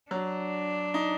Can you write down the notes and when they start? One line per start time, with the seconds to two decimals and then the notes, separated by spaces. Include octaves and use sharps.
0.11 F#3 D4
0.94 D#4